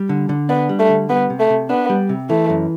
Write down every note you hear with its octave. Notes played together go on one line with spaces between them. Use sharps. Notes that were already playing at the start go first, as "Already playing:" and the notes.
Already playing: G3
D3
D3
B3 D4
G3
A3
D3
G3 B3
C3
A3
C3
B3 D4
G3
C3
E3 A3
F#2